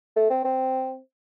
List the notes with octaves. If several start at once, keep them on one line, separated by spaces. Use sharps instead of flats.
A3
C4
C4